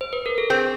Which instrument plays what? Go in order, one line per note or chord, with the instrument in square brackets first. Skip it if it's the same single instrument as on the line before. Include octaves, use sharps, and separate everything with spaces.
[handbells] C5
B4
A#4
A4
[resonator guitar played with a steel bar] C4 [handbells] G#4